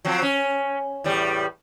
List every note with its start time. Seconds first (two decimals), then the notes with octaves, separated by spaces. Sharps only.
0.05 F3 F#3 C4
0.22 C#4
1.04 E2 A2 G3